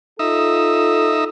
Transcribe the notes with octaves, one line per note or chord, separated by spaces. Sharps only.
D#4 F4 A4 E5